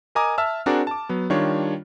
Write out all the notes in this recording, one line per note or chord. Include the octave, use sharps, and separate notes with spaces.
A#4 D#5 G#5 A#5 D6 D#6
E5 A5 E6 F6
C4 D4 F#4 G#4 A#4 D5
A5 D6
F#3 B3
D#3 G3 D4 F4 C#5